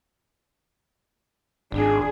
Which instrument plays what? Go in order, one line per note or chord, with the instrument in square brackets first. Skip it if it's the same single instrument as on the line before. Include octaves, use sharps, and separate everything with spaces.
[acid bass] G#1 [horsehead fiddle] D4 G#4